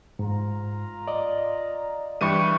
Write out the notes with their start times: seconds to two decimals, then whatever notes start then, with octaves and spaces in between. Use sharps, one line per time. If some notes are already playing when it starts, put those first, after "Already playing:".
0.19 G#2 F4 A#5
1.08 D5 D#5
2.21 G2 E3 G3 D4 G4 C#6 D#7